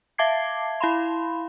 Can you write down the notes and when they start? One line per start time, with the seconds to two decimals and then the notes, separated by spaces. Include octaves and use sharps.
0.18 E5 F5 A5 D6 G#6 C7
0.81 E4 F5 B5 C6